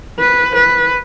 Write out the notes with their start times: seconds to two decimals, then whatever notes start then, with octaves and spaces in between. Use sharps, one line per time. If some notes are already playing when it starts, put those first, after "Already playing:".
0.19 B4
0.55 B4